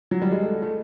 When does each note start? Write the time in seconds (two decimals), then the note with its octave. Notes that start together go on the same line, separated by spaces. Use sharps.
0.11 F#3
0.22 G3
0.32 G#3
0.43 A3
0.62 A3